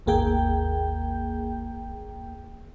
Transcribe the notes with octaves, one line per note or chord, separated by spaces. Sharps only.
G#1 D#2 A#3 G#4 G5 G6